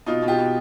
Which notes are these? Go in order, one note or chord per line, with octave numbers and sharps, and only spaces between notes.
B2 D#4 F4
B2
F4 G4
B2